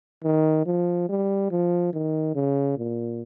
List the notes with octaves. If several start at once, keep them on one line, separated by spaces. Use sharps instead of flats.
D#3
F3
G3
F3
D#3
C#3
A#2